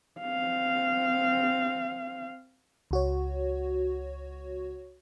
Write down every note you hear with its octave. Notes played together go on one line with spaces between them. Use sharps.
C4 F5
C#2 F#4 C#5